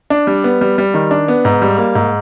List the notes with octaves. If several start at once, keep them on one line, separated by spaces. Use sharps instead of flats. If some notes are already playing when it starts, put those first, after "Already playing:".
D4
G3
B3
G3
G3
D#3
D4
B3
G#2
G3
A#3
G#2